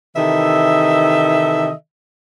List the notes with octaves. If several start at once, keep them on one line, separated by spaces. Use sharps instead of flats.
C3 D#3 E3 A4 D#5 E5